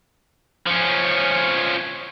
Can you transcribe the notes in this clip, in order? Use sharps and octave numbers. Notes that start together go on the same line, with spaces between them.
F3 C#4